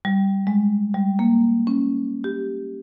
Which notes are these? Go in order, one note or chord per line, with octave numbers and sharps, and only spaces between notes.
G3
G#3
G3
A#3
C#4
G4